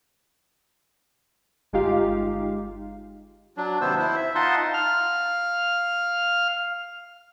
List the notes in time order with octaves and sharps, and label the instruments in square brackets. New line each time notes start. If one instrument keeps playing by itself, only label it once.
[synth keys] G1 G#3 D#4 F4 G4 F5
[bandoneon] F#3 D4
D#2 C3 B3 C5 E6
E4 C5
E5
D#4 F4 D#5 F#5 A5 C6
[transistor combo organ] F5 F6